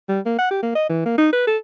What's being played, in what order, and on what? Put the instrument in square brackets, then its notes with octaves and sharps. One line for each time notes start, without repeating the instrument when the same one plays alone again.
[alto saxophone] G3
A#3
F#5
G4
A#3
D#5
E3
A#3
D#4
B4
A4